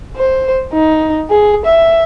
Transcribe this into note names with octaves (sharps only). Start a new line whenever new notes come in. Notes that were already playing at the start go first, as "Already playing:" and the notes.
C5
D#4
G#4
E5